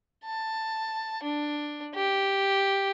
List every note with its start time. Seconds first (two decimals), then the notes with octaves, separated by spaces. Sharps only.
0.25 A5
1.23 D4
1.94 G4